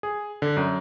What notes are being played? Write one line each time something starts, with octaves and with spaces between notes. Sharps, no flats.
G#4
D3
F#2